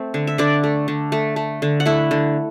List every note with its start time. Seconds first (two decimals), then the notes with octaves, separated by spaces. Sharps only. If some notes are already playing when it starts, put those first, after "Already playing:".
Already playing: A3 C4
0.14 D3
0.27 E5
0.38 D3 D4 D5
0.64 A3
0.88 D3
1.12 A3
1.36 A3
1.62 D3
1.80 F#5
1.85 A3 E4 E5
2.11 D3